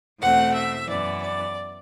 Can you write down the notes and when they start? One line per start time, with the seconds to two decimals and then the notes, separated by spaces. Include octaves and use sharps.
0.20 E2 B2 A3 C4 F#5
0.53 E5
0.87 F#2 E3 B3 D5
1.20 D5